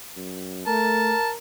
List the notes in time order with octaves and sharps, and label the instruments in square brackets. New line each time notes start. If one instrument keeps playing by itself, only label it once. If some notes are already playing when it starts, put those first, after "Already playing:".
[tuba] F#2
[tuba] A3 [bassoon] A#4 [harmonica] A5